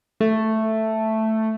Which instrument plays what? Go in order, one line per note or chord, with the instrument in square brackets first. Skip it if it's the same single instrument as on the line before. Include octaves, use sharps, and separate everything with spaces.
[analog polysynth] A3